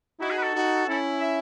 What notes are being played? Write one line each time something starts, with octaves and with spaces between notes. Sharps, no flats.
D#4 E4 F#4
G#4
B4
A4
D#4 F#4
C#4 E4
E5